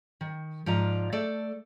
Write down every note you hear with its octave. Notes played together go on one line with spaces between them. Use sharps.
D#3
G#2 F3 F4 D5 A#5
A3 A4 D5